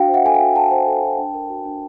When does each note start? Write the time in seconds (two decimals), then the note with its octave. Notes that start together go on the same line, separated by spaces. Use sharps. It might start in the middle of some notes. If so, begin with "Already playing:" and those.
Already playing: D4 F#4 F5 G5
0.08 C5
0.14 E5 F#5
0.24 A4 G#5
0.35 F5 G5
0.40 F#4
0.56 F#4 G5 A5
0.71 C5
0.87 A4
1.03 F#4
1.19 D4
1.34 A#4
1.50 F#4
1.65 D4